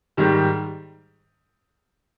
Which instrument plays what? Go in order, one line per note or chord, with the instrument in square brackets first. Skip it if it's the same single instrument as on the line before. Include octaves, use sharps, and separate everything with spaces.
[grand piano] G#2 D#3 G3